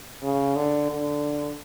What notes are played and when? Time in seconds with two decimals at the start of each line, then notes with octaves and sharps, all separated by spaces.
0.23 C#3
0.56 D3
0.90 D3